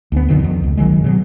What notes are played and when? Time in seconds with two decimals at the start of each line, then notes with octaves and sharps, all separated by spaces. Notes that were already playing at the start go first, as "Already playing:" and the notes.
0.12 D2 B3
0.28 B1 F2 D3 D#3
0.44 F2
0.64 C#2
0.77 F#1 D#3 F#3 G#3
1.04 B2 F#3